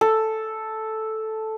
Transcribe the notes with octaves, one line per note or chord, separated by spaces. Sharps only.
A4